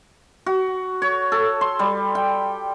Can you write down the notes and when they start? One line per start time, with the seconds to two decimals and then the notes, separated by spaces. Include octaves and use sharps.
0.46 F#4
1.02 C#5
1.32 A4
1.61 C6
1.79 G3
2.15 G5